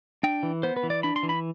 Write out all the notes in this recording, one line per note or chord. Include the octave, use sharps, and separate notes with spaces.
D4 G5
E3
B3 C5
B4
E3
D5
D4 B5
C6
E3
B5